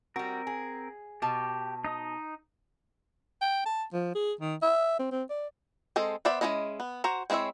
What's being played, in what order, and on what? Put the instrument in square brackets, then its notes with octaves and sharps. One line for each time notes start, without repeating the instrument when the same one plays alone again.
[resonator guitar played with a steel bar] G3 F#4 [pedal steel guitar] C4 A#4
[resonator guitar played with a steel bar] G#4
[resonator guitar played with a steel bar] B2 A5 [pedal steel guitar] G4
[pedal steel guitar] D#4 D#5 D#6
[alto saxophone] G5
A5
F3
G#4
D#3
E5
C4
C4
D5
[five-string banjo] G#3 C4 A4 D#5
B3 C5 D5 E5 B5
G#3 C4 C#4 E4 D#5
B3
F#4 C5 A#5
G#3 C4 E4 C#5 E5